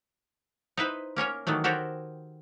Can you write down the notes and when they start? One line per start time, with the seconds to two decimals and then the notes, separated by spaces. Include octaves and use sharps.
0.77 D#4 E4 B4 C5
1.16 A#3 C#4 A#4 C#5
1.47 D#3 E3 F#3 A3
1.64 F#4 G4 A4 A#4 C5 C#5